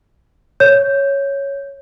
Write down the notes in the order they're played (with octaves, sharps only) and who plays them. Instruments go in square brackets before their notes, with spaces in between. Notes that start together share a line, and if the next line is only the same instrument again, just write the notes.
[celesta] C#5 G6